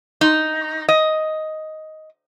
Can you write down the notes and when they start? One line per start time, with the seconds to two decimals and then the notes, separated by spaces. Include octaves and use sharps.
0.21 D#4
0.89 D#5